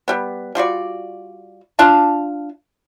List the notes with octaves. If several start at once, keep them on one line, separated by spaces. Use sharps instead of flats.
G3 B3
G3 F4 F#4 D5
D4 F4 F5 A5